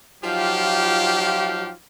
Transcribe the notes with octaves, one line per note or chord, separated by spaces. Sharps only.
F3 F#3 D#4 F4 G4